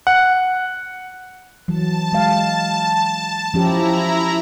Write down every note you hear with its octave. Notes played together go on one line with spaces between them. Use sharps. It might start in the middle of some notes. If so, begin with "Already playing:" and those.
F#5
E3 F#3 A5
G#3 F5
F3 C#4 E4 G4 A#5